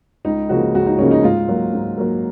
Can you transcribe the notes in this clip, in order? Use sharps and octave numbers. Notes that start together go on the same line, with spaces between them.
C#2 D#4
C#3 F3 A#3 F#4
C#2 F#4
D#4
C#3 F3 A#3 C#4
D#4
G#2 F4
F#3 A#3
G#2
F#3 A#3